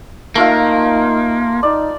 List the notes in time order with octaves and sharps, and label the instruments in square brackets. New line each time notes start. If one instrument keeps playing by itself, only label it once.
[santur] A3 F4 F5 [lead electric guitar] A#3 [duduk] D#4
[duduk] D#4 [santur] D5